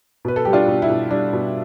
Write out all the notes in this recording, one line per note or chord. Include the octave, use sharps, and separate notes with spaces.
B2 B4
A4
G3 G4
D4 F4
B2
E4
B2
G3 D4
B2